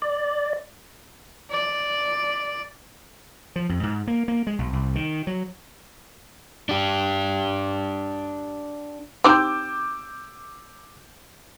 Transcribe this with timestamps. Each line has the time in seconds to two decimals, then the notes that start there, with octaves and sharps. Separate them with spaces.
0.02 D5
1.51 D5
3.56 F3
3.69 F2
3.83 G#2
4.07 A#3
4.28 A#3
4.47 G#3
4.59 B1
4.73 C2
4.95 D#3
5.27 F#3
6.69 D4 G4
9.24 C4 D#4 G4 D6 E6 G6